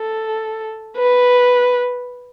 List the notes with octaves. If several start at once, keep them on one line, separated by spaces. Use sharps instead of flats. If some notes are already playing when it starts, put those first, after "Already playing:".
Already playing: A4
B4